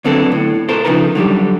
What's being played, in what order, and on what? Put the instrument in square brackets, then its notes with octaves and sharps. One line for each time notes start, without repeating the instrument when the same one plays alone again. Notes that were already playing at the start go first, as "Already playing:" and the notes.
[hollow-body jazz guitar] D3 F#3 B3 C4 D4 A4
A2
B2 A4 A#4 C5
C#3 F3 D#4 A#4 B4 A#5
D3 F#3 G3 G4